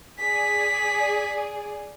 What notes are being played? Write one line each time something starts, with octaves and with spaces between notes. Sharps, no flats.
G#4 D5 B6